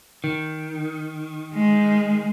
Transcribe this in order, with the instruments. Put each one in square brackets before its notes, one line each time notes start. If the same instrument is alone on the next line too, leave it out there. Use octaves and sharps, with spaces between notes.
[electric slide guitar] D#3
[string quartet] G#3